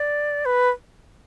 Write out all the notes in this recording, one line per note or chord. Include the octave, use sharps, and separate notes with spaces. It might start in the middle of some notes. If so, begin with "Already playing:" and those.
Already playing: D5
B4